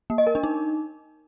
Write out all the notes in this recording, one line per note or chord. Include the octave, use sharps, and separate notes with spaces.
A#3
D#5
A#4
D4
D#4